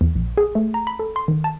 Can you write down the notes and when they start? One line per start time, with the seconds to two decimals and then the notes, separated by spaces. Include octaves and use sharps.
0.01 E2
0.16 A#1
0.37 G#4
0.55 A3
0.74 A#5
0.87 B5
0.99 A4
1.16 C6
1.28 D#3
1.44 A5